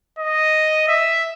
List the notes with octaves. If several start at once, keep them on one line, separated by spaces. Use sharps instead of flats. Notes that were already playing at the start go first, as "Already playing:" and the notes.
D#5
E5